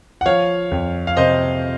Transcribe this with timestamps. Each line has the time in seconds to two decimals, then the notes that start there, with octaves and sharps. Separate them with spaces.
0.21 F#5
0.26 F3 C#5 F5
0.71 F2
1.07 F5
1.17 C3 C5 D#5